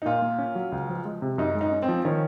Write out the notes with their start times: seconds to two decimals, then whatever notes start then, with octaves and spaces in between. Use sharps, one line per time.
0.02 D#4
0.06 A#2 F4
0.22 A#3
0.38 C#4
0.55 F#3
0.72 C#2
0.89 F3
1.05 G#3
1.22 C3
1.38 F#2 D#4
1.55 G#3
1.61 D#4
1.72 C#4
1.82 C4
1.88 F3
2.05 D#3 C#4